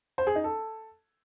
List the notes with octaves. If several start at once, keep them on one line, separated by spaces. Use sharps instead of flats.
C5
G#4
D#4
A4